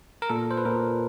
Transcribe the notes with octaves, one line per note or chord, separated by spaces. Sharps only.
A#4
A#2 A4
C5
B4
A#2 A#4